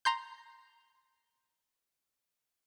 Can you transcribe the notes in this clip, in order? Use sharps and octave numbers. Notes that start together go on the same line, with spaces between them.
A#5 C6 G6